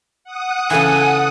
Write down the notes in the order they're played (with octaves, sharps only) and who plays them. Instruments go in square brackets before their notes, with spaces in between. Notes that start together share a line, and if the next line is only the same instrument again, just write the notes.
[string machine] F#5 D#6 F#6
[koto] C#3 E3 [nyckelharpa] A4 [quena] G#5